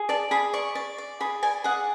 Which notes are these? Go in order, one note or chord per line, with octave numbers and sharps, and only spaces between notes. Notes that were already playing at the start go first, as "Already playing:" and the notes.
Already playing: G#4
D5 A5
G#4 B5
D5 C#6
D5
D5
G#4 B5
D5 G#5
G#4 F#5